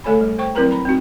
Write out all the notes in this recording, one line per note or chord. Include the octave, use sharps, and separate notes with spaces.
D3 A3 A4 C#5 G#5 B5
G3
C5 G5 C#6
F#3 C4 E4 A#4 B4 A#5
A#5 B5
C4 D#4 F#4